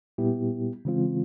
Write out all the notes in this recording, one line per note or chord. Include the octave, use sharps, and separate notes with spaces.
A#2 G3 B3 E4 G4
C#3 E3 G#3 C4 F4